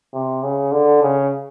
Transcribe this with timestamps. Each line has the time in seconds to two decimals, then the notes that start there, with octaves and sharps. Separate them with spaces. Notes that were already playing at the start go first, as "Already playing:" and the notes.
0.14 C3
0.44 C#3
0.72 D3
1.02 C#3